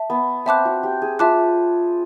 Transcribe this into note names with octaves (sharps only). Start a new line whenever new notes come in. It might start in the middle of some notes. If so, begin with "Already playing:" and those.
Already playing: E5 A5
B3
C4 E5 A5 D6 F#6
F#4
G4
G#4
F4 E5 A5 D6 F#6